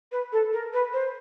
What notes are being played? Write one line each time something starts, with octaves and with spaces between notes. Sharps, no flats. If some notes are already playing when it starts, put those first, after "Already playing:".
B4
A4
A#4
B4
C5